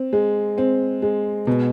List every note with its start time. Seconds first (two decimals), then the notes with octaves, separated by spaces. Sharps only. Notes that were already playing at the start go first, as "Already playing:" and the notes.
Already playing: C4
0.13 G#3
0.58 C4
1.02 G#3
1.47 B2